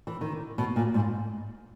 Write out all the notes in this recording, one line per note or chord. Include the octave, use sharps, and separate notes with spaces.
E3
D#3
B2
A#2
G#2